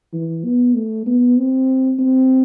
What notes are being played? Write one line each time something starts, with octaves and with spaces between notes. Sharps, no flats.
E3
B3
A3
B3
C4
C4